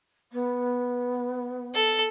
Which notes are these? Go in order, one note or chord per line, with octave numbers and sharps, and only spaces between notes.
B3
A4